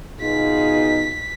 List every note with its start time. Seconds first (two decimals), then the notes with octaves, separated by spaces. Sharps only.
0.21 B2 D#4 F4 G#4 B6